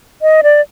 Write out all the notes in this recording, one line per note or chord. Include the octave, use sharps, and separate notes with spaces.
D#5
D5